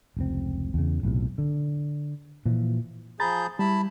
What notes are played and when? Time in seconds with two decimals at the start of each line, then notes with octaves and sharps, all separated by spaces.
0.17 F1 C#2 C4
0.74 E2 C#3
1.03 B1 A2 C3
1.38 D3
2.46 A#2 E3 F3
3.20 F3 G#4 A#5 B5 G6 A6
3.59 G3 E4 A5 B5